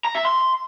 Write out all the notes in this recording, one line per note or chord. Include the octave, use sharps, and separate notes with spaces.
A#5
E5
C6